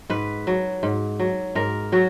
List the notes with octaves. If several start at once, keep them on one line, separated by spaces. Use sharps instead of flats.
G#2 B4
F#3
G#2
F#3
G#2 A#4
F#3 F#4